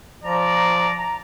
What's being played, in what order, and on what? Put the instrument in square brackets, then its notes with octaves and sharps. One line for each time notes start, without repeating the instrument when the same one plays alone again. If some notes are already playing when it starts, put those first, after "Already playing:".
[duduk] F3 [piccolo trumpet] D5 [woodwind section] A#5